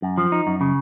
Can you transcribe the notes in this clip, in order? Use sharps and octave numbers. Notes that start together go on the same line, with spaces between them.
F#2
F3
D#4
F#2
C#3